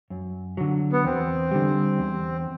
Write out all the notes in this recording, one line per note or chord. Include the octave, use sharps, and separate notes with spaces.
F#2
D3 F#3
B3
E2 C4
D3 G3
E2